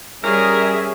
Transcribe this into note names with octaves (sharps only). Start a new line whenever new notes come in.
G3 C#4 G#4 A#4 E5